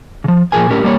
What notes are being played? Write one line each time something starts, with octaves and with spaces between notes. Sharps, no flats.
C#3 F3
A#2 F3 F#3 G#4 A#4 G#5
A2 C#4 G4 A#4
G3 A#3 C5 C#5